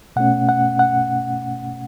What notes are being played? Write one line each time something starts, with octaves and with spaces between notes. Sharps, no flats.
B2 A3 C#4 F#5
F#5
F#5